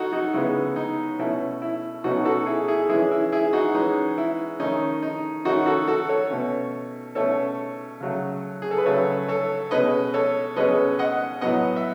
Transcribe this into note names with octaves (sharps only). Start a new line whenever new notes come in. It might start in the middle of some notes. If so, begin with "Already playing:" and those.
Already playing: D#4 F#4 A4 C#5
D#4 F#4
C#3 G#3 B3 E4
D#4
B2 A3 C#4 E4
E4
B2 A3 C#4 D#4 F#4
F#4 A4
E4 G#4
E4 G#4
E3 G#3 C#4 E4 G#4
E4
E4 G#4
D#4 F#4
E3 G#3 C#4 D#4
E4
D#3 A3 C#4 D#4
D#4
D#3 A3 C#4 D#4 F#4
F#4 A4
F#4 A4
A4 C#5
B2 A3 C#4
B2 A3 C#4 A4 C#5
C#3 F#3 A3
G#4
A4
B4
C#3 F#3 A3 A4 C#5
A4 C#5
B2 G#3 C#4 B4 D#5
A4 C#5
B2 G#3 C#4 B4 D#5
D#5 F#5
A2 F#3 B3 D#5 F#5
E5